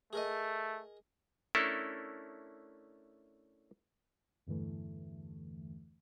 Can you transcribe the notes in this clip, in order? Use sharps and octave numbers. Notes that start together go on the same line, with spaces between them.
A3 G#4 A#4 D#5
A3 C#4 D4 E4 A4 A#4
E2 G2 D3 E3 A3